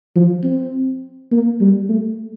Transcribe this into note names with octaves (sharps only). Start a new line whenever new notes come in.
F3
C4
A#3
G3
A3